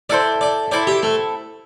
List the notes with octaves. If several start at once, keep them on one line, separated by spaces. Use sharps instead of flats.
E4 A4 C5 D5
D5
C4 E4 A4 D5
G4
A3